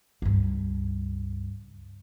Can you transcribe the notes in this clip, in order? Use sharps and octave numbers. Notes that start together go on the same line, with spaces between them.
C#2 G2